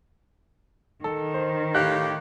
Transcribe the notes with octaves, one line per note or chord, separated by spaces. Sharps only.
D#3 A4
C5
A2 G4 F5 F#6